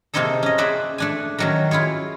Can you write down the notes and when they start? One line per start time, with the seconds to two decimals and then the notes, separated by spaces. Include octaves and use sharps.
0.14 C3 A#3 C4 D#4 G#4 A4
0.43 C#4 D#5
0.58 G#4 C5 D5 E5 F#5
0.98 A3 D4 G#5
1.38 D#3 F#3 C#4
1.71 E4 F4 G#4 C#5